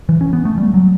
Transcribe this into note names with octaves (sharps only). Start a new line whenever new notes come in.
E3
C#4
B3
A3
G3
F#3